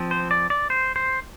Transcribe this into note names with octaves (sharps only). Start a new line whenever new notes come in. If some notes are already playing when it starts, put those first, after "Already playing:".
Already playing: F3 C4
C5
D5
D5
C5
C5